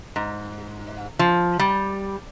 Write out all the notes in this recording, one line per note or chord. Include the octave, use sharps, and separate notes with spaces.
G#2
F3
G3